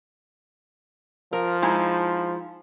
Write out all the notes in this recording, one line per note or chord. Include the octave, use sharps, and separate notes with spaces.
F3 A#4
G#3 D#4 E4